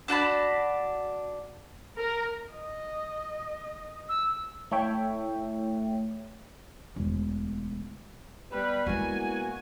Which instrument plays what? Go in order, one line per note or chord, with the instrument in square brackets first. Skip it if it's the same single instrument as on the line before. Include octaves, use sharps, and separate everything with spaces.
[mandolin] D4 F#4 A5 B5
[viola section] A#4
[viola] D#5
[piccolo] E6
[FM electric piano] A3 E4 A4 C#5 E5 G5
[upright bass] E1 D2
[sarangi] G3 [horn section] B3 G4 B4
[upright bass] G#3 E4 [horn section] A#3 B3 F#4 [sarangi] G#5